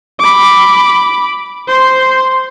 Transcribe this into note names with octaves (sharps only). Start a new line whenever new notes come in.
B5 D6
C5 C6